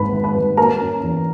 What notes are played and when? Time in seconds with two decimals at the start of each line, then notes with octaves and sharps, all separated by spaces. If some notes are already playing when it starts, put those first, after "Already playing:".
Already playing: G#1 G#2 B4 B5
0.13 D#3
0.24 B4 B5
0.36 G3
0.57 A#3 A#4 A#5
0.81 C#4
1.03 E2